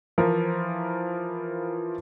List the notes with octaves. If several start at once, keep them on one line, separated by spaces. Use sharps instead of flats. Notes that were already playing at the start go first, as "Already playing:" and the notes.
E3 F3 F4 A#4 C5